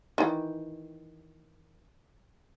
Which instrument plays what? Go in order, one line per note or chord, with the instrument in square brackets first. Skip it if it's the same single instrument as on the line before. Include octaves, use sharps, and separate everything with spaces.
[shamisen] D#3 E3